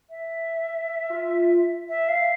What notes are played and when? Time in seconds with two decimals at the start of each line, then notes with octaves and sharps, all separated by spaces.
0.10 E5
1.10 F4
1.89 E5
2.09 F5